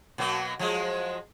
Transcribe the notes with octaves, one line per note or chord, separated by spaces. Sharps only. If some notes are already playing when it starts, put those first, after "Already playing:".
B2 F#3 A#3
F3 F#3 G#3